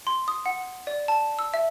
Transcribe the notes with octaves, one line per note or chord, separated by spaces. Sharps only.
C6
D#6
F#5
D5
A5
E6
E5